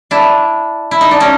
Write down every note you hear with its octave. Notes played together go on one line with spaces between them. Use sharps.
D4 E4
E4
D#4
D4
C#4 D#4